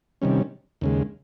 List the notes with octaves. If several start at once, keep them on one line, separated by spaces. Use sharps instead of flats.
C3 D#3 G3 C#4
D#2 C#3 G#3